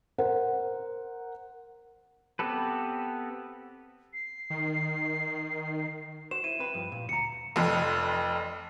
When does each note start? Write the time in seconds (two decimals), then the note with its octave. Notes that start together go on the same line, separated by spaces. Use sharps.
0.18 A#4 C5 F#5
2.39 B3 C4 G4 A4 B4
4.13 C7
4.50 D#3
6.31 F#4 C5 E7
6.44 E4 D#7
6.59 C4 B4
6.74 G2 F3
6.92 A#2
7.09 D2 A#5 C#7
7.56 F1 F2